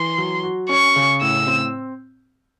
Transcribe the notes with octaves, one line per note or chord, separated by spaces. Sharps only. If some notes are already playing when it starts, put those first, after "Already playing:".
Already playing: E3 C6
F#3
F#4
C#4 C#6
C#3
A2 E6
C4